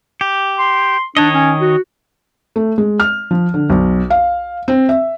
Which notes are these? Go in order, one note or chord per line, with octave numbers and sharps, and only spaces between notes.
G4
C6
D#3 D4 C#5 D#5
C#4
F#4
A3
G#3
F6
F3
D3
B1
F5
C4
E5